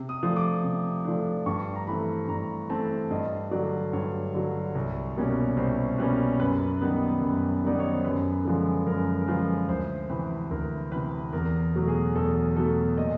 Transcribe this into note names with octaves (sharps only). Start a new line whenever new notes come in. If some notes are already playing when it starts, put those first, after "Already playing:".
Already playing: C3
D#6
F3 A3 D4
D6
C3
F3 A3 D4
G2 C#6
A#5
E3 A3 C4 B5
G2 A#5
E3 A3 C4 A5
G2 D#5
D3 F#3 D5
G2 C#5
D3 F#3
C2
B2 G3 A#3 C#4
C2 C5
B2 G3 A#3 C#4 B4
F#2 B4
D#3 G3 B3 D#4
F#2
D#3 G3 B3 D#4 D5
C#5
C5
F#2 B4
D3 F3 G#3
F#2 A#4
A#4
D3 F3 G#3 B4
D2 C5
C3 E3 B4
D2 A#4
C3 E3 B4
E2 A#4
B2 F#3 A3
G#4
E2 A4
B2 F#3 A3 A4
A#2 D#5